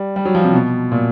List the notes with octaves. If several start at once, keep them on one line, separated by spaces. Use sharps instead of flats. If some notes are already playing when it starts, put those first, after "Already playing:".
Already playing: G3
G3
F#3
F3
C3
B2
A#2